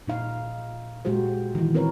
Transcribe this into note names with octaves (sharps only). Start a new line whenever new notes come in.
A#2 D#4 F5
A#2 G#3 F#4 G4 C5
D#3 E3
C4 A#4 B4 C#5